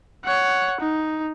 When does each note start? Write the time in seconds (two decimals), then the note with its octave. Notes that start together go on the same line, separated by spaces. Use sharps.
0.25 C#5 F#5
0.81 D#4